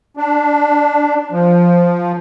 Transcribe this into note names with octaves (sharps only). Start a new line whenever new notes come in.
D4
F3